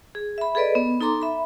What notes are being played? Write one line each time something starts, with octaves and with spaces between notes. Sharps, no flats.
G#4
E5 B5
G#4 A4 B4 D5 D#5
B3
D#4 A4 A#5 C6 D6
E5 B5